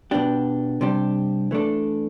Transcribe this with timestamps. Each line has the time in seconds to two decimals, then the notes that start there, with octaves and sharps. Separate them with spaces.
0.11 B2 B3 D4 G4
0.81 C3 G3 D4 G4
1.51 E3 A3 D4 A4